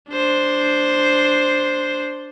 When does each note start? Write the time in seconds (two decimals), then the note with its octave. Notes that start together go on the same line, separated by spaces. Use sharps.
0.11 D4 C5